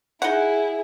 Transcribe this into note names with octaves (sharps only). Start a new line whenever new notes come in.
D#4 E4 G#4 F#5